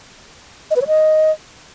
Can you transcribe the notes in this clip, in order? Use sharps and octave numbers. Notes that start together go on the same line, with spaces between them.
D#5
B4
C#5
D#5